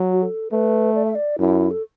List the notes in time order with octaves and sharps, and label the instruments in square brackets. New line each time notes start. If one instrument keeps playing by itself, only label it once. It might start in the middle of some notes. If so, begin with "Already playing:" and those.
Already playing: [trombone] F#3
[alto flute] F#4
A4
[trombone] A3 [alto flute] B4
[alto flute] D5
E5
D5
[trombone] F#2 [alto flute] E4
[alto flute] A4